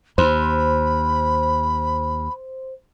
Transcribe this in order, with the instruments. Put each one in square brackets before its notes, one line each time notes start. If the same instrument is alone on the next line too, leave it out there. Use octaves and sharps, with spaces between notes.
[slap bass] D#2 [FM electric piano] C5 [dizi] B5